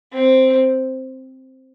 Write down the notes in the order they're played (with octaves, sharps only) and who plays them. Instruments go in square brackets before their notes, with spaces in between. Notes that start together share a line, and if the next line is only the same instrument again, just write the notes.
[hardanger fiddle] C4